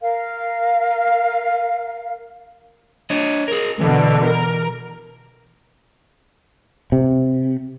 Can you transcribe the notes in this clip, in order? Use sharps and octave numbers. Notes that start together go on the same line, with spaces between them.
A#4 F5
D4 C#5 D#5
G#4 A#4
B2 D3 E3
A#4
C3